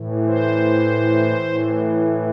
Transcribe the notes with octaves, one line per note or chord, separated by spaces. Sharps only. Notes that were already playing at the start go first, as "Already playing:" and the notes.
Already playing: A2 E3
C5
A2 E3